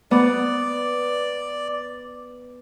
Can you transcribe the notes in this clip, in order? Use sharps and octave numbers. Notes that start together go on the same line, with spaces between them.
B3 D5